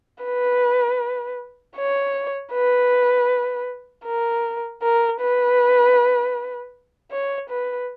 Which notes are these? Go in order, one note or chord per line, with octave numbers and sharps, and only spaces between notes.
B4
C#5
B4
A#4
A#4
B4
C#5
B4